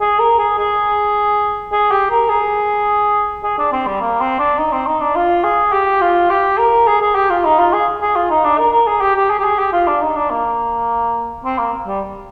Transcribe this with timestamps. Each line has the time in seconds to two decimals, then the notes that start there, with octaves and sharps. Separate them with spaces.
0.01 G#4
0.20 A#4
0.39 G#4
0.58 G#4
1.72 G#4
1.91 G4
2.11 A#4
2.29 G#4
3.44 G#4
3.58 D4
3.73 C4
3.87 G3
4.01 A#3
4.21 C4
4.39 D4
4.58 D#4
4.72 C4
4.87 D#4
5.01 D4
5.15 F4
5.44 G#4
5.73 G4
6.01 F4
6.30 G4
6.58 A#4
6.87 G#4
7.01 G#4
7.15 G4
7.30 F4
7.45 D#4
7.59 F4
7.73 G#4
8.02 G#4
8.16 F4
8.30 D#4
8.44 D4
8.59 A#4
8.73 A#4
8.87 G#4
9.02 G4
9.16 G4
9.30 G#4
9.39 G4
9.44 G#4
9.59 G4
9.73 F4
9.87 D4
10.02 D#4
10.16 D4
10.30 A#3
11.45 C4
11.58 A#3
11.87 G3